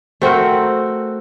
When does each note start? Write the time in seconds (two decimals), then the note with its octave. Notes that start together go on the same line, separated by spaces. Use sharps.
0.22 A3 C4 F#4 A#4